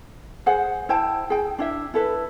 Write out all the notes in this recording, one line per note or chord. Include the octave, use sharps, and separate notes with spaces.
G#4 C5 F#5
E4 C5 G5 A5
G#4 G5
D4 E4 E5
E4 A4 B4